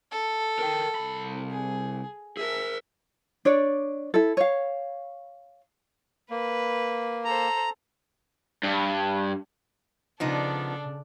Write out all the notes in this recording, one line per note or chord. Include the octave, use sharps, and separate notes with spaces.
A4
A#4 G5
C2 B5
G#4
G#4 A#4 E5
D4 C#5 D5
E4 A4
C#5 F5
A#3 B4
A4 C5 A#5
G2
C#3 F3 B3 D4 D#4 A4 D5